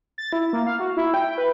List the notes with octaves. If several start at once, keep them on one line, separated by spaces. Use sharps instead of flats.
A6
E4
A#3
F5
F#4
E4
G5
B4